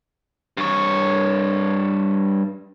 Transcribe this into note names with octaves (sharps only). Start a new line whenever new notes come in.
G2 C#5